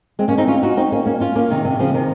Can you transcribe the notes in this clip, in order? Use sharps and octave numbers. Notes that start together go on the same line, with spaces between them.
G#3 C4
A#3 C#4
C4 D#4
C#4 F4
D#4 F#4
C4 D#4
A#3 C#4
A#3 C#4
C#4 F4
A#3 C#4
C3 D#3
C3
C#3 F3
C3 D#3